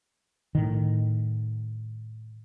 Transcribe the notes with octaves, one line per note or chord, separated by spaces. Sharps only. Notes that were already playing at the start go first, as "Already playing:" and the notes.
A2 D#3